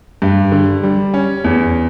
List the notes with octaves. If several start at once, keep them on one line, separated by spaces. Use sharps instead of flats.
G2
D3
G3
C#4
E2